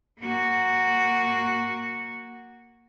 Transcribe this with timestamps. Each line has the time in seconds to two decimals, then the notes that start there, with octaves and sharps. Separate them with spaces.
0.21 A#3 F#4